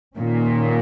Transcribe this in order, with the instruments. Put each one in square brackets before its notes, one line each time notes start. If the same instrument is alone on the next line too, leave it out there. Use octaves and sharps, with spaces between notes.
[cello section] A#2 [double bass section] D#3 A#3 C#4